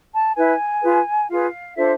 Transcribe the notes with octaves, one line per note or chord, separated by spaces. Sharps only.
A5
E4 B4 G#5
F4 G#4 B4
F4 G#4 B4 F5
D4 F4 A4 C5 E5